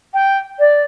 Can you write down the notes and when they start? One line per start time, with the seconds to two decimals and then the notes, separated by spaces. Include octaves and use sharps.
0.14 G5
0.59 D5